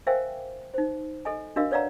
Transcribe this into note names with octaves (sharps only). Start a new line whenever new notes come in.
A#4 C5 E5 F5 G5 G#5
D#4 C5
A4 D#5 G#5
D4 F#4 A#4 D#5 F5
B4 C#5 D5 F5 F#5 A#5